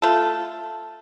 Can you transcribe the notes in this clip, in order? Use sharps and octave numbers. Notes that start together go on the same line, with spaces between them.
A3 F4 A4